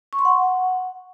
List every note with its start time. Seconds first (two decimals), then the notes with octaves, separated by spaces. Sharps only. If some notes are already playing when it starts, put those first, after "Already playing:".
0.13 C#6
0.19 C6
0.25 F#5